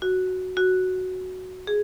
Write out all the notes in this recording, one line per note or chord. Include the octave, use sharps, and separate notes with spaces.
F#4
F#4
G#4